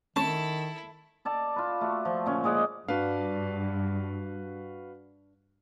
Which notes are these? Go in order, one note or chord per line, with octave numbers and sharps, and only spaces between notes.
D#3 A3 C4 C#4 E4 A4 A5
A4 D5 A5
F4 B4
A3 F#4
F3
A#2 D3 C#4
G#3 G#4 D5 F#5
G2 D4 F#4 B4 F5